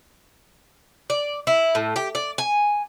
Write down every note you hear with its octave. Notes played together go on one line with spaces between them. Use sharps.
D5
E4
A2
G4
D5
G#5